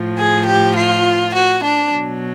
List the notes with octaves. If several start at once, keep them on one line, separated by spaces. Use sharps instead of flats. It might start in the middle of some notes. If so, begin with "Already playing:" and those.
Already playing: A2 F3
G#4
G4
F4
F#4
D4
B2 F#3